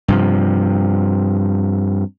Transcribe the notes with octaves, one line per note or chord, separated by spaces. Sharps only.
G2 C3 F3